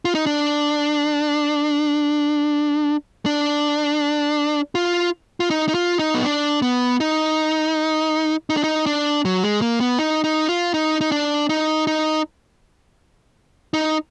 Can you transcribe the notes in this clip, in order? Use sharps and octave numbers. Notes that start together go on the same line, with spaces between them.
F4
D#4
D4
D4
F4
F4
D#4
D#4
F4
D#4
B3
D4
B3
D#4
D#4
D4
D#4
D4
F#3
G#3
A#3
B3
D#4
D#4
F4
D#4
D#4
D4
D#4
D#4
D#4